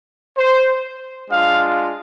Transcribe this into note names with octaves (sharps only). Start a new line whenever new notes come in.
C5
G#3 D4 F4 F5